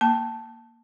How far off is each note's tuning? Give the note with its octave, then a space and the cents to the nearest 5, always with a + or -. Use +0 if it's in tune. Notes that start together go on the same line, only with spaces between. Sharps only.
A#3 +0 A5 +0